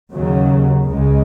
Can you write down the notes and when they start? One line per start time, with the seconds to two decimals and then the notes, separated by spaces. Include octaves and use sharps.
0.12 D#2 C#3 F#3
0.84 C#2 C#3 G#3